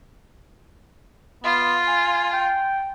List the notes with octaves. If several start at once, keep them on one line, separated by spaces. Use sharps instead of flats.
B3 F4
G#5
G5